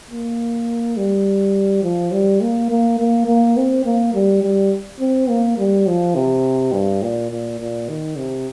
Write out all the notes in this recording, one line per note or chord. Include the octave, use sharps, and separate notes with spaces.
A#3
G3
F3
G3
A#3
A#3
A#3
A#3
C4
A#3
G3
G3
C4
A#3
G3
F3
C3
G2
A#2
A#2
A#2
D#3
C3